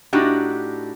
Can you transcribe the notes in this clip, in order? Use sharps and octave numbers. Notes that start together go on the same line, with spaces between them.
A2 D4 D#4 F#4 G4